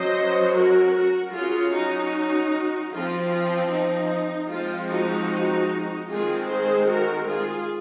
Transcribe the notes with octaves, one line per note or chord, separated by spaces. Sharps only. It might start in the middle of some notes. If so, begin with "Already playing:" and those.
Already playing: F#3 C#4 C5 D#5
F#4 A#4
F#4 A#4
F#3 C#4 F4 G#4
D#4 F#4
F3 C4 F4
F4
D#4
F3 G#3 C4 F4
D#4 F#4
D#3 G#3 C4 F4 G#4
G#4 C5
F#4 A#4
F4 G#4